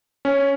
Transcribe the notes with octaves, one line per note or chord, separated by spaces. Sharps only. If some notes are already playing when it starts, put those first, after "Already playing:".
C#4